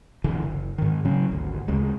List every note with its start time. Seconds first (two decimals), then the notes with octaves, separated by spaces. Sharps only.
0.24 C2 D3 E3
0.42 F#1
0.78 G#2 D#3
1.05 C#3 F#3 C#4
1.30 G#1 D2
1.68 D2 C#3 G#3